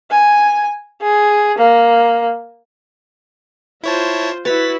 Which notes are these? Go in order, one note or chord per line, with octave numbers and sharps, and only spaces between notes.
G#5
G#4
A#3
E4 F4 C5 C#5 A5
E4 F#4 B4 C#5 A6 B6